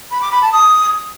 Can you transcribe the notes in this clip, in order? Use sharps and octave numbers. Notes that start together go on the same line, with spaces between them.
B5
D6
B5
A5
D#6